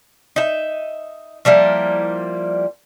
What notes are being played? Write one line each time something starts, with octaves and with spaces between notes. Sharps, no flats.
D#4 E5
F3 G3 A#3 E4